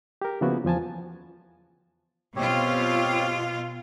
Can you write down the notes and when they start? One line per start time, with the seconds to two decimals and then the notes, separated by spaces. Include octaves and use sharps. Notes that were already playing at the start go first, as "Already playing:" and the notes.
0.22 G4 A#4
0.41 C#3 F3 A#3 B3 E4 F#4
0.65 E2 F3 G#5 A5
2.36 B2 C4 F4 G4 C#5